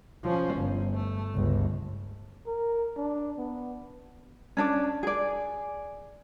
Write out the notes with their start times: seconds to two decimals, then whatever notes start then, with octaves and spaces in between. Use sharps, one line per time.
0.23 F3 C#4
0.55 G1
0.94 A3
1.34 G1 C#2
2.47 A#4
2.96 D4
3.38 B3
4.57 C#4 D4 D5
5.03 G#4 D5